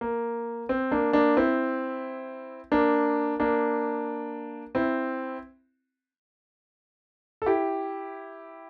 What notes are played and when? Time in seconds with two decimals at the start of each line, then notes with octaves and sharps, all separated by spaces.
0.01 A#3
0.69 C4
0.92 A#3 D4
1.13 A#3 D4
1.37 C4 E4
2.72 A#3 D4
3.40 A#3 D4
4.75 C4 E4
7.42 A4
7.46 E4 G4